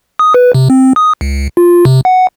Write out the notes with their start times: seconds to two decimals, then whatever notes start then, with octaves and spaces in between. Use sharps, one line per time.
0.19 D#6
0.34 B4
0.54 C3
0.70 C4
0.96 D#6
1.21 C#2
1.57 F4
1.85 C3
2.05 F#5